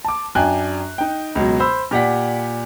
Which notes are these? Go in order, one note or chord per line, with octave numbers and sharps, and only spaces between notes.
A5 D6
F#2 D4 G5 G#5 F#6
D#4 G5
C#2 B2 F#3
C5 B5 E6
A#2 G4 D5 F#5 B6